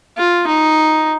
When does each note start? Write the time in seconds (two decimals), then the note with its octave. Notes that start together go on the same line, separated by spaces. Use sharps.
0.17 F4
0.47 D#4